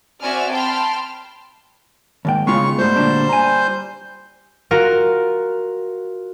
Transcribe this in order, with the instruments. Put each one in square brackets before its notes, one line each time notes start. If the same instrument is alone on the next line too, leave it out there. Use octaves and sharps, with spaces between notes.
[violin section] C4 F#4 D5 E5 G#5 F6
G5 A5 B5 C6 F6
[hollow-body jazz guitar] D#2 G#2 G5
[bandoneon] C#3 C#6 [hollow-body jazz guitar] G#3 B3 F4
[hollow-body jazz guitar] G#2 A3 [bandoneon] G3 C5 G6
[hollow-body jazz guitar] D2 A#2 D4
G#5 A#5
[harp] F4 F#4 A#4